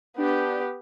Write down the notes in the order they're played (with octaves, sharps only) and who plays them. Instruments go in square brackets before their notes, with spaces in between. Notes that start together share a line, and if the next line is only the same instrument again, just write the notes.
[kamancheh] B3 G4 [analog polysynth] D4 G6